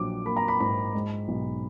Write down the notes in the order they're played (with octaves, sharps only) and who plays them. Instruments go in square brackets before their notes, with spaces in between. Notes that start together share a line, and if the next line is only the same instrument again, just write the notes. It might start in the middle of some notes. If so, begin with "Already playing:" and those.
Already playing: [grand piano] A#1 F#3 D6
A#3 B5
A#5
B5
G#2 B5
G#3
B1